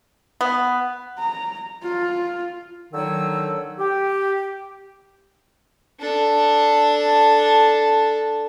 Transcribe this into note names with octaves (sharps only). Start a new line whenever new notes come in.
B3
A#5
F4
D3 D#3 F#3 D#4 E6
G4
D4 A4